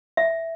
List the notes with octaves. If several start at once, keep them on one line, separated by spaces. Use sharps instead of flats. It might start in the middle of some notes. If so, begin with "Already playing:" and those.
E5